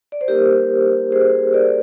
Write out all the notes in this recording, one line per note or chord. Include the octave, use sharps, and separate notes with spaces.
D5
C5
G3 A#3 D#4 G4 A#4
G#4 C5
A#4 D5